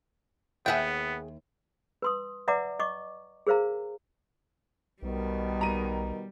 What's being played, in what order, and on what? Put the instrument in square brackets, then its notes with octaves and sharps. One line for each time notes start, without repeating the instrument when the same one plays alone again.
[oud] D#2 E5 [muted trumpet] B3 [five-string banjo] G#4 F#5 G5
[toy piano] B4 C6 D#6
B4 D5 E5 F#5 A#5 D6
D#5 C#6 D6
G#4 A#4 C5 F5 A#5
[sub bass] B1 [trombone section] B2 D#3 [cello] G3
[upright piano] A#5 D#7